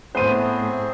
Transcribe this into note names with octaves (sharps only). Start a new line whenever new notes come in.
A2 A3 B3 C4 G#4 C5 D#7